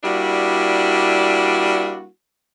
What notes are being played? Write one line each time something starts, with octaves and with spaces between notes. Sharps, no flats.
G3 A#3 D4 E4 F#4